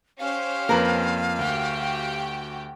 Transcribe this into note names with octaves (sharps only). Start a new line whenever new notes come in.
C#4 G4 C5 F5
F2 A#3 A#4 B4
D2 F#4 G4 G5